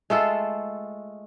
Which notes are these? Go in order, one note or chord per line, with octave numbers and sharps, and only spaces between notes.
G#3 A3 F4 A4